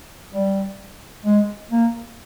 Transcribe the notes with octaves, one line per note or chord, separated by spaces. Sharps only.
G3
G#3
A#3